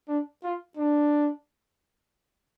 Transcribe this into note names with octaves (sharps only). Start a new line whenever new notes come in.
D4
F4
D4